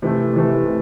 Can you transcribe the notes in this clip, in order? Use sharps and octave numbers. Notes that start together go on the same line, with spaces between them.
C3 E3 A3
C3 E3 A3
C3